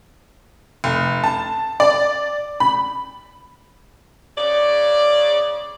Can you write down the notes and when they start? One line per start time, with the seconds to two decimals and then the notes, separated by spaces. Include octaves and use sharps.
0.84 F1
1.24 A5
1.80 D5
2.60 B5
4.38 C#3 D5